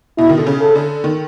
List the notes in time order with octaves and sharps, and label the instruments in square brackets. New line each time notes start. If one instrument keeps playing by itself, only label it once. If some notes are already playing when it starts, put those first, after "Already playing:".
[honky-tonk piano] B2 [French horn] E4
[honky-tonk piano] D#3
D3
C#3
[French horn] A4
[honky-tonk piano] D3
D#3